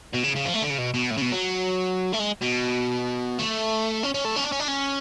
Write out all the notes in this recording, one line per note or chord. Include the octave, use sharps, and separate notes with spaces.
B2
C#3
C#3
F3
A3
D3
C#3
B2
B2
A2
C#3
B2
F#3
A3
G#3
B2
A3
C#4
C#4
A3
C#4
D4
C#4
D4
C#4